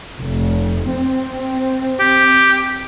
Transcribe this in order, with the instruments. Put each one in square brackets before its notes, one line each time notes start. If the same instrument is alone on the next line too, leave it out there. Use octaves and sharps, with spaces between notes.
[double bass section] F1
C4
[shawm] G4